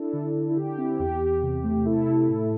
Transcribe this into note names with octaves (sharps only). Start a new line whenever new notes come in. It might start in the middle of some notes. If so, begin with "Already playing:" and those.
Already playing: D4 E4 A4
D3
D3
E4
D3 G4
C4 E4
E2 G4
E2
C3
A3
C3 E4 A4
C3
A2